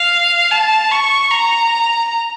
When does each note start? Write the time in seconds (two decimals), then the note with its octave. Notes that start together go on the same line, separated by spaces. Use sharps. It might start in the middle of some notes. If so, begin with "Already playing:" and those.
Already playing: F5
0.51 A5
0.91 C#6
1.31 A#5